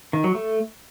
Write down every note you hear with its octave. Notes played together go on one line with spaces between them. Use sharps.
D#3
F#3
A3